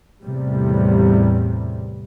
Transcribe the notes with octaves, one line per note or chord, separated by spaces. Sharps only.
E2 A2 C3 G3